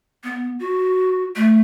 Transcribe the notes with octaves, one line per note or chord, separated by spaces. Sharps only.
B3
F#4
A3